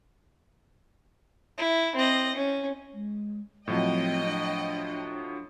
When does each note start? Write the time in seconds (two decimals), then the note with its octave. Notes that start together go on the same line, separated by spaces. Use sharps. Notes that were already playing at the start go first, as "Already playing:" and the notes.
1.58 E4
1.95 C4 D#5
2.36 C#4
2.93 G#3
3.68 A2 F3 F#3 C4 D#5 G5
4.24 D4